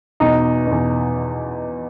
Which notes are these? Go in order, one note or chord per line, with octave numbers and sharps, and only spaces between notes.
E2 B2 D#4
E2 B2